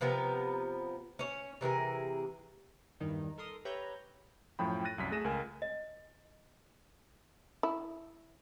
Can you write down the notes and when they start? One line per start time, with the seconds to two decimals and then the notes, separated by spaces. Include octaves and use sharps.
0.01 C3 F3 B3 A#4
1.19 C#4 C#5
1.61 C3 E3 G#4 A#4
3.00 E2 G2 D#3 D#4
3.38 A4 A#4 C6 D#6
3.65 G4 B4 C#5 E5 A#5 G6
4.59 F#2 A2 F3 G5 B5
4.85 F#6 A6 A#6 D#7
4.98 C2 F#2 B6
5.11 A3 G#4 A#6 D#7 E7
5.24 C#2 A#4 G#5
5.62 D#5
7.63 E4